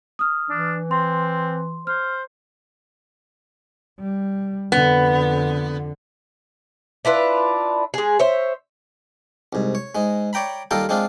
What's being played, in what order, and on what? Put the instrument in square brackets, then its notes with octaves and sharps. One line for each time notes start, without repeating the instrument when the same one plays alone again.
[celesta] D#6 F6
[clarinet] E3 [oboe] D4
[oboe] C4 [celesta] C6
[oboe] C5 [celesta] F6
[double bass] G3
[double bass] F2 D3 [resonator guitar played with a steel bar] B3
[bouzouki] D4 E4 F4 B4
G#3 G#4
C5 C#5 E5
[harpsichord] C2 G#2
C#5
G#2 G#3
C#5 D5 G5 A#5 B5
D#2 G3 F4 A4 G5 A#5
G#3 C4 D4 F4